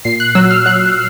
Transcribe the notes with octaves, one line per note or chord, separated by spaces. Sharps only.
A#2 C7
F#6
F#3 E6
F6
F#3 F#6